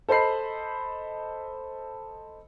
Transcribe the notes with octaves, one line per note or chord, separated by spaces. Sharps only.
A4 C5 D#5 B5 C7